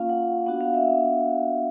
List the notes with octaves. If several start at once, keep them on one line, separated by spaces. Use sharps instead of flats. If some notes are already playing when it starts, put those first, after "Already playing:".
Already playing: A#3 C#4 F4 F5
F#5
B3 D4 F#4 F#5
F5
E5